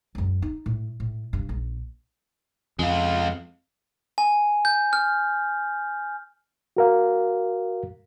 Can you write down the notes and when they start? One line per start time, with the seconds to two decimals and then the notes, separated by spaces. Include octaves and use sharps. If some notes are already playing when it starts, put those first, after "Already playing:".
0.15 C#2 F#2
0.42 D#4
0.66 A2
1.00 A2
1.33 G2 C3
1.49 A#1
2.79 F2 G#3 F4
4.18 G#5
4.65 G6
4.93 F6
6.77 F#4 A#4 F5